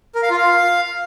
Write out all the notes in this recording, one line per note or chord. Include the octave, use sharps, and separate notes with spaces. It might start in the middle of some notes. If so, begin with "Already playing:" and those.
A#4
F5
F4
F5